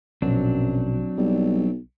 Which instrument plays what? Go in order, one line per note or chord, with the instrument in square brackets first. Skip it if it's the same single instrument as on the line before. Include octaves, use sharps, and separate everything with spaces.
[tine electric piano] A#1 B2 [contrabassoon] F#2 [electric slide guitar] F#3 C4 D4
[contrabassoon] B1 [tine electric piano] G3